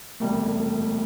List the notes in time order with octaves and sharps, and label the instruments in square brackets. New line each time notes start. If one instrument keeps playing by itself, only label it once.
[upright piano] E1 D2 C3 G3 A#3 [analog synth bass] A3